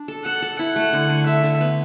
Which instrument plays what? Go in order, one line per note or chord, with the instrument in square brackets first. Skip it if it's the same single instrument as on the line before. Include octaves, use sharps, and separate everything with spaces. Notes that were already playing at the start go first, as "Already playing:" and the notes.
Already playing: [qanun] D4
A4
[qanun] A4 [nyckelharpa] F#5
[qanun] A4
[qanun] E4 [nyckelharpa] F#5
[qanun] A3
D3
D3
[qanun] A3 [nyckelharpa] E5
[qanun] D3
B3